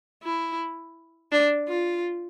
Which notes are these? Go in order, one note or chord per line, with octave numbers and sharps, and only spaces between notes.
E4
D4
F4